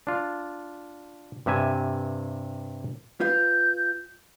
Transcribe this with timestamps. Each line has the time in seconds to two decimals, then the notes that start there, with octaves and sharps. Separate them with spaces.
0.07 D4 F4
1.46 G2 C3 E5 G#5
3.20 F4 B4 F5 G6